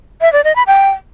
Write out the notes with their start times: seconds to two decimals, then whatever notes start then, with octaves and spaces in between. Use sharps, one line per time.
0.21 E5
0.33 D5
0.44 D#5
0.56 B5
0.67 G5